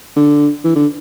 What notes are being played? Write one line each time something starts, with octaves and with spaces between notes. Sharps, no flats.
D3
E3
D3